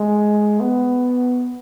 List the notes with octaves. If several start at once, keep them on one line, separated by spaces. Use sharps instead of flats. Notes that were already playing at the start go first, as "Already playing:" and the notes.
Already playing: G#3
B3